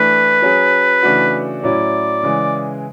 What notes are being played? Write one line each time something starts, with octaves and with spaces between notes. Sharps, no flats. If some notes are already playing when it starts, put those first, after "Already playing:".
Already playing: E3 A3 D4 B4
F#3 C#4 G#4
C#3 E3 A3 D4 F#4
A2 F#3 C#4 E4 D5
C#3 E3 G#3